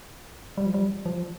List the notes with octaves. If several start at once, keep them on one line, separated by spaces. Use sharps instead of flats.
G3
F3
G3
F3